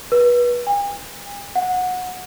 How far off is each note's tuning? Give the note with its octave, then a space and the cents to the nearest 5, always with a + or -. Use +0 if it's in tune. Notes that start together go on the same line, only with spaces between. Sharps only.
B4 -25
G#5 -45
F#5 -20